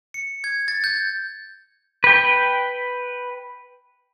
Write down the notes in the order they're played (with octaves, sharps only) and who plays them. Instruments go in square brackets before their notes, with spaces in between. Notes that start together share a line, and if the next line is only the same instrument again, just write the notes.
[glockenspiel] C#7
G#6
A6
G6
[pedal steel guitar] B4 G5